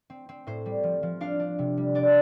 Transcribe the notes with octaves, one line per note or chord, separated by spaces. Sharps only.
C4
C4
A2 C5
G3
F3
F3
D4 F5
D4
C3
G3
D4 D5